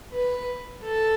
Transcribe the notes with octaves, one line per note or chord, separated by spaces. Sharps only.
B4
A4